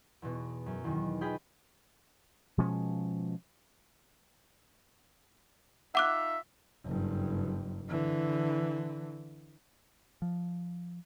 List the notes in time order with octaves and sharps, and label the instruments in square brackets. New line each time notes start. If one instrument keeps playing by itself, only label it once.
[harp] E2 B2
F#2
E2 D#3
F4 G#4 D#5 G5 B5
[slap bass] B2 F3 G#3 C#4
[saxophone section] D#4 F4 E5 [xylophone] F#5 D6 F#6
[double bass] F#1 G2
D3 E3
[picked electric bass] F3